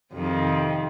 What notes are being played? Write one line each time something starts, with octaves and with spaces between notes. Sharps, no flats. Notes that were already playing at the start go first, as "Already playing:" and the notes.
F2 C3 D#3